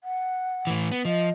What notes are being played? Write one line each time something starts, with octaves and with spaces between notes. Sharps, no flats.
F#5
A2 E3
B3
F3 D#5